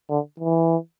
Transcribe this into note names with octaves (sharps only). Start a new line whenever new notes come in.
D3
E3